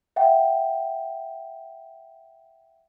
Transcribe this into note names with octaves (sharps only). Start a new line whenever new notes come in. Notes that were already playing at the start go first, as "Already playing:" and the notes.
E5 F#5 G5